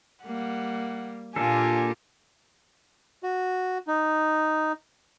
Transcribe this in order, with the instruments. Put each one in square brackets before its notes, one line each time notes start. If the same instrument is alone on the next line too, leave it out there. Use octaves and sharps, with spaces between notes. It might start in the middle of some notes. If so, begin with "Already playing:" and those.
[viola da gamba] G3 A#3 [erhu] F#5
[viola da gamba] A#2 F4 G4 [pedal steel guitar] A#3 D4 A4 [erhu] G#5
[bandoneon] F#4
D#4